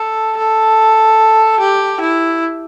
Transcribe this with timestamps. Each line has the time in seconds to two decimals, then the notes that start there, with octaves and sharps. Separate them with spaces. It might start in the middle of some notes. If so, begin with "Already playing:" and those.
Already playing: A4
0.38 A4
1.60 G4
2.00 E4